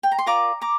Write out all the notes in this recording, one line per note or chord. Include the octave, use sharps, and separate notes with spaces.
G5
A#5
C6
F4 A#4 D5 A#5 D6
A#5 D6